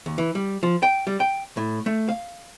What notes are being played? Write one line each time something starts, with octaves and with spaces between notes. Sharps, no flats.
D#2
E3
G3
F3
G5
G3
G5
A2
A3
F5